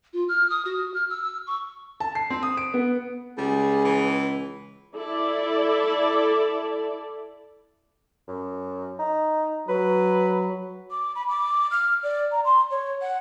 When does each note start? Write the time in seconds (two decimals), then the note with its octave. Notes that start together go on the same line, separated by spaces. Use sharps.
0.13 F4
0.29 F6
0.50 D#6
0.65 F#4
0.94 F6
1.10 E6
1.23 E6
1.47 C#6
2.00 A5
2.15 C7
2.30 C4
2.43 D#6
2.57 D7
2.74 B3
3.38 C#2 G3 G#4
3.84 E3
4.96 E4 A4 D5
8.28 F#2
8.99 D#4
9.68 F#3 B4
10.91 D6
11.15 B5
11.29 D6
11.71 F6
12.03 D5
12.31 A#5
12.45 C6
12.71 C#5
13.02 F#5